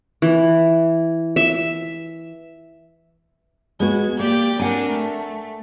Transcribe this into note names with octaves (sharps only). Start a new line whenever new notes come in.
E3
E5
G#3 B3 F#4 G#6
A#3 G4 D5 G5
C4 D4 A#4 F#5 G#5
A3